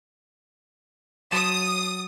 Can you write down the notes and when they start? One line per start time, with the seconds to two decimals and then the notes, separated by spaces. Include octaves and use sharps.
1.32 F#3 A5 D#6